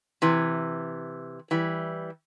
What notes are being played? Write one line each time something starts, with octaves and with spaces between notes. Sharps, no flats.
C3 E3
E3 G3